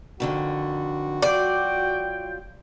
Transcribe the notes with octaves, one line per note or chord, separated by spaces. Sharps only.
F2 D3 D#3 F#4
F#3 F4 D5 G5